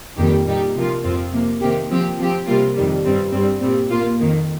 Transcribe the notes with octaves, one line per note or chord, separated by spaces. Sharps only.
F2 D#3 G3 A#3 G4
A#2 G3 D#4 G4
C3 F3 A#3 F4
F2 F3 C4 F4
C3 F3 A#3
C3 D#3 A#3 G4
F3 C4 G4
F3 C4 G4
C3 G3 A#3 F4
F2 D#3 G3
G2 G3 C4
G2 G3 C4
A#2 G3 C4
A#2 A#3 F4
F2 D#3 A#3